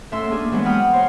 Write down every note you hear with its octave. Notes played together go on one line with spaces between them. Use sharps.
A2 C#4 E5 C6 E6
A#3 D4 G#4
E3 F#3 G#3 B3
F#5 G5 B5 D#6 F6
C5 C#5 A#5 C6